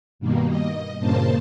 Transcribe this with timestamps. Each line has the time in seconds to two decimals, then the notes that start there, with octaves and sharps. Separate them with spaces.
0.19 G2 B2 D#3 G3 A#3
0.50 D#5
0.99 G2 A#2 C#3 A#3 C5 A5